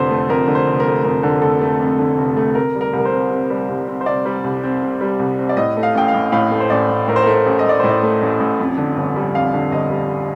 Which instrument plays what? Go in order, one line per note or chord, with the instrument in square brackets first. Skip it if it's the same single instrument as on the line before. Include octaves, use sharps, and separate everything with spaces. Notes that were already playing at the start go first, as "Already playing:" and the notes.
Already playing: [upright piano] F1 F2 D3 C5
A3
F2 A#4
D3
C5
F1
A#4
A3
F2 A#4
D3
F1 A4
A3
F2
D3
F1
A3
C3 A#4
G3
A#4
C2 A#4
C5
C4
C3
G3
C2
C4
C5
C3 D5
G3
C2
C4
C3
G3
C2
C4
D5
A2 D#5
A3
F5
A1 G5
F5
A1
A2 F5
A3
C5
A1 D5
A1
A2 A#4
C5
A3 A#4
C5
A1
D#5
A1 D5
A2 C5
D5
A3
A1
A1
F2
D3
G1
G3
F2 F5
D3
G1 D#5
G3